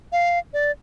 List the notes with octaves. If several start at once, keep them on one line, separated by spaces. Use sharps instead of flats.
F5
D5